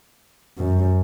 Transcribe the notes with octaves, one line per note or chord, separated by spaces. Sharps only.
F#2